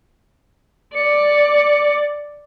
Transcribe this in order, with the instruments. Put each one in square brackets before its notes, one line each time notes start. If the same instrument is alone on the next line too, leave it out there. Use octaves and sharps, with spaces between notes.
[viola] D5 [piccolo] C#7